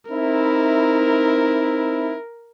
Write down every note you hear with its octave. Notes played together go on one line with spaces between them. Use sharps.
C4 D#4 E4 A#4